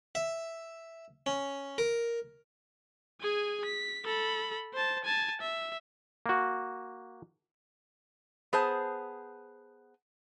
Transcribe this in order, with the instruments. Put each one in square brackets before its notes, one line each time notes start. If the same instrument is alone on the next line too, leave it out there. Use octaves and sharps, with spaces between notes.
[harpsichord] E5
C#4
A#4
[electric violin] G#4 G#5
B6
A4 B5
C5 A5
G#5 A5
E5
[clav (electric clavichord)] A#3 F#4
[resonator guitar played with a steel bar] B3 G#4 C5 A5